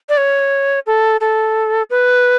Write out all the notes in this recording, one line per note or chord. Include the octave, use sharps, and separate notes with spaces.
D5
C#5
A4
A4
B4